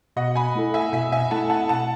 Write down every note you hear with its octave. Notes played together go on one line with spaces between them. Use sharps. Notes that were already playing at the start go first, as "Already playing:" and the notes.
B2 D#5 F#5
G#5 B5
A3 E4 A4
E5 G#5
B2 E5 G#5
E5 G#5
A3 E4 A4 F#5 A5
F#5 A5
B2 F#5 A5